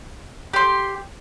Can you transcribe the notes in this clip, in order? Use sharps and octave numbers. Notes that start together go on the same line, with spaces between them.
G4 C6